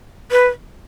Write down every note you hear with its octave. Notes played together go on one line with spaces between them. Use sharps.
B4